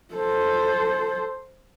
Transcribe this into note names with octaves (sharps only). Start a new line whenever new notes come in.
A4 C5